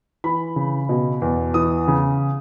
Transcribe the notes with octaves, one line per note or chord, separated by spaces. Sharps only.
E3 B5
C#3
B2
E2
E3 D#6
C#3